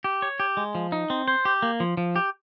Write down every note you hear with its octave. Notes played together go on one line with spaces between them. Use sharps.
G4
C#5
G4
G#3
F3
D#4
C4
C5
G4
A#3
F3
F3
G4